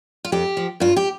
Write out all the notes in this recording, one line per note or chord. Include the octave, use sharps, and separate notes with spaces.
F4
F2 G4
F3
G2 F4
G4